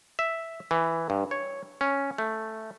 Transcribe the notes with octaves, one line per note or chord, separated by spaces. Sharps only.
E5
E3
G2
C#5
C#4
A3